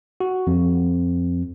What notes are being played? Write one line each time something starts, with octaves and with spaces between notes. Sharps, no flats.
F#4
F2